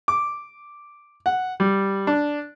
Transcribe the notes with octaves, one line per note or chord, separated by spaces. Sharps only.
D6
F#5
G3
D4